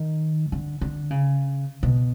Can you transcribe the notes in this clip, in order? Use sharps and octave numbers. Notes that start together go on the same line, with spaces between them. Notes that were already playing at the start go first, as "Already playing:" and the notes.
Already playing: D#3
D3
D3
C#3
B2